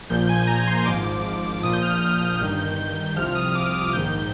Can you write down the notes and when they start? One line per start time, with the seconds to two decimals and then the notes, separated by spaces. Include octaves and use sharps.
0.10 A#1 A#2 F3 G6
0.29 G#5
0.47 A#5
0.67 C6
0.85 G#1 G#2 F3 D6
1.63 A#1 A#2 F3 D#6
1.73 G6
1.82 F6
2.02 F6
2.40 G1 G2 D#3 G6
2.59 G6
2.78 G6
3.16 C2 C3 F3 F6
3.35 D#6
3.55 D6
3.74 D6
3.93 A#1 G#2 D#3 G6
4.13 G6